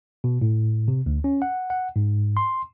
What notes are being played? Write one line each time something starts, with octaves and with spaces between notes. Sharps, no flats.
B2
A2
C3
D2
C#4
F#5
F#5
G#2
C6